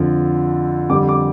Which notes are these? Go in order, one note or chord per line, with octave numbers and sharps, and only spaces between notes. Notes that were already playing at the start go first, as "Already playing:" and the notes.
Already playing: F2 D3 F3
F2 D3 G3 D6
D6